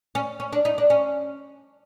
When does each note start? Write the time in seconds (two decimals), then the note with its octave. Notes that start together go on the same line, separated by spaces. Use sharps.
0.15 C#4
0.40 C#4
0.53 D4
0.65 D#4
0.78 D4
0.90 C#4